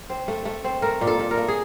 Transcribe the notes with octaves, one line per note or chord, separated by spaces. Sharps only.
C4
A3
A3
C4
A3 A#4
A#2
A4
A#2
A#4
A3
G#4